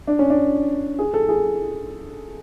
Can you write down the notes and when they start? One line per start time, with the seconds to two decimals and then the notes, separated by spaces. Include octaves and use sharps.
0.07 D4
0.19 C#4
0.30 D4
0.99 G#4
1.14 A4
1.29 G#4